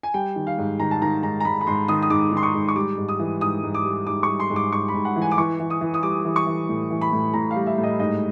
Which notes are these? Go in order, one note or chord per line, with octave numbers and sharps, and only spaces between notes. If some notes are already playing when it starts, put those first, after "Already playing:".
G#5
G3 G5
D#3
F5
G#2
D#3 A#5
A5
D#3 A#5
G#2 A#5
A#5
G#2 B5
B5
G#2 C6
D#3 D#6
D#6
G#2 D6
D#3 C6
C#6
G#2
C#6
G3 D6
G#2
D#6
E3
G#2 D#6
G#2
D6
G3
G#2 D6
C#6
G3
C6
G#2
D6
G#2 C#6
B5
G#2
F#5
E3
G#5
D6
E3 C#6
E3
D#6
E3
D#6
G3 D6
E3
C#6
E3
A2
E3
B5
A2
A2 A#5
F5
G3
E5
A2
D#5
G#2 D#5